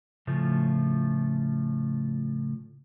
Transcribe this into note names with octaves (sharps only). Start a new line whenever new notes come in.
A2 C#3 F3 A3